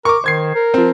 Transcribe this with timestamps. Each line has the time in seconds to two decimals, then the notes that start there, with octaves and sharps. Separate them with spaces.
0.05 A#4 C#6 D6
0.24 D#3 C5 G#6 C7
0.55 A#4
0.74 F3 C4